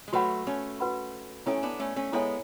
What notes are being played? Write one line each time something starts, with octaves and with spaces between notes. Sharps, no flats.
G#3
F#3 A3 F#4 B4 F#5 B5
A3 C#4
F#4 B4 F#5 B5
A3 C#4 E4 A4 C#5 E5 G#5
B3 D4
A3 C#4
A3 C#4
G#3 B3 E4 A4 C#5 E5 G#5